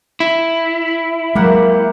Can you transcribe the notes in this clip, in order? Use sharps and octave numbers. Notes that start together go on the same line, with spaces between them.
E4
F#3 G#3 A#3 G4 F#5